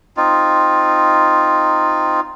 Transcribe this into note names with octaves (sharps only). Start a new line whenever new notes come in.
C4 D#4 F4